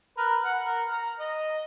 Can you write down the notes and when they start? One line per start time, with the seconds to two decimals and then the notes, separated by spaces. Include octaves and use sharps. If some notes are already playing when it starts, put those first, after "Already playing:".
0.18 A#4 B4
0.45 F#5
0.64 A#4
0.91 A#5
1.19 D#5